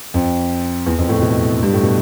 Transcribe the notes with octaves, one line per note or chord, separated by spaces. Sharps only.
F2
E2
F2
A2
B2
G2
A2
B2